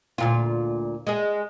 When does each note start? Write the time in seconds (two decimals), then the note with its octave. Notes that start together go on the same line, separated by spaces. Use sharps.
0.18 D2 A#2 F4
1.07 G#3 G#4